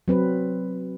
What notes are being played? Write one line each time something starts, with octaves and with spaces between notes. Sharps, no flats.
F#3 C4 B4